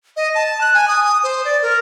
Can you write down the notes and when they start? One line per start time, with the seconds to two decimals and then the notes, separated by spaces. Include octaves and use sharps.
0.17 D#5
0.35 A5
0.61 F#6
0.74 G#5
0.88 D#6
1.04 D#6
1.23 C5
1.45 D5
1.62 A#4